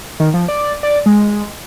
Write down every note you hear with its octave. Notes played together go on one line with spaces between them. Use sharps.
D#3
F3
D5
D5
G#3